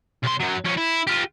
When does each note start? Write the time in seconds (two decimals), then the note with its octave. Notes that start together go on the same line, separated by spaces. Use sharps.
0.23 B1 C6
0.40 F#2 F#3
0.64 F2 C#4
0.77 E4
1.07 F4 G4